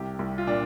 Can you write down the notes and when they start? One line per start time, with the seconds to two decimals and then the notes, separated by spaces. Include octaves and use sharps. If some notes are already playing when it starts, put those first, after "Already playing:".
Already playing: C2 C3 G4
0.19 C2
0.38 F4
0.47 A#2 D4